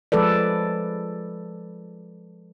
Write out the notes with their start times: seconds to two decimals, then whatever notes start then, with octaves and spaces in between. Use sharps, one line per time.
0.12 F3 G#3 A4 B4 D5